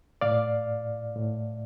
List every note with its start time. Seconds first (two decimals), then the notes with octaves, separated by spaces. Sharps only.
0.21 A2 D5 F5
1.16 A2